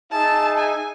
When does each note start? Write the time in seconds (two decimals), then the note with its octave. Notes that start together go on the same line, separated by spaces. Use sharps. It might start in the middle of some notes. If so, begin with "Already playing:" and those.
0.11 D#4 G#4 E5 A5
0.58 G#5